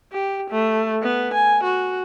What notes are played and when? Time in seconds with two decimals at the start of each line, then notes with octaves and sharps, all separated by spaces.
0.12 G4
0.50 A3
1.03 B3
1.33 G#5
1.63 F#4